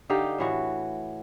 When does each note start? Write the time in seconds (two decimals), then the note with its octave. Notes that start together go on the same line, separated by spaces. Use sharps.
0.09 D3 D#4 G4 F5
0.38 A2 E3 F#4